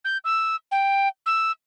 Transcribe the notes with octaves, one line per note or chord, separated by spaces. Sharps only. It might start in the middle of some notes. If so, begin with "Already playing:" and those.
G6
E6
G5
E6